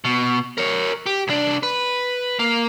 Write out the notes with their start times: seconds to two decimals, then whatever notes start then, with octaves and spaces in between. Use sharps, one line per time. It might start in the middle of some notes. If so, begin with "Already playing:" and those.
0.04 B2
0.58 A#4 C#5
1.06 G4
1.28 C2 D4
1.63 B4
2.39 A#3